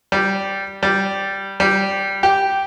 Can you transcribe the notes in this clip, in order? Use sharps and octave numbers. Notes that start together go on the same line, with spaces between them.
G3
G3
G3
G4